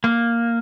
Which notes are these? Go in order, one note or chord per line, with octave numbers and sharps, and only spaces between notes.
A#3